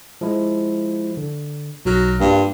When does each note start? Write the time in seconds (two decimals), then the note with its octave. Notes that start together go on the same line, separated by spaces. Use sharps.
0.21 F3 G#3 E4
1.17 D3
1.85 B1 F#3 F6 A#6
2.20 G2 A#3 F4